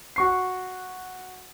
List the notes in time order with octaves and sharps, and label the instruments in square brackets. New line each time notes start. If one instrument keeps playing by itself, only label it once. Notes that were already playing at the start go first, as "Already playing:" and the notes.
[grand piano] F#4 C#6 C7